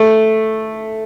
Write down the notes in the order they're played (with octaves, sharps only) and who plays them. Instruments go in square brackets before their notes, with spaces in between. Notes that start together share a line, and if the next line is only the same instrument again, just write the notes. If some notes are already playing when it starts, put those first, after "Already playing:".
Already playing: [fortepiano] A3